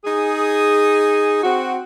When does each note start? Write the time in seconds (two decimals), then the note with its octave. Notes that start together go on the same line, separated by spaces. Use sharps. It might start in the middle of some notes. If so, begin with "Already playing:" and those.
0.05 D#4 G#4
1.43 C4 F#4